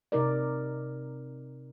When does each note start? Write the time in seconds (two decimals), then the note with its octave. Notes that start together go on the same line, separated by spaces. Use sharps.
0.12 C3 D#4 A#4 D5